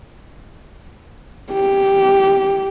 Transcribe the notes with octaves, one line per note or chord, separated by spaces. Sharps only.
G4